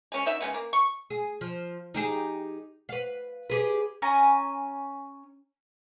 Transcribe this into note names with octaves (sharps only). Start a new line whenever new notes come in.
G#3 C#4
F#3 D#4 E5
C#3 G#3 B3
A#3
C#6
G#4
F3
D#4 G4 G#4
B4 F5
G4 G#4 B4
C#4 G#5 A#5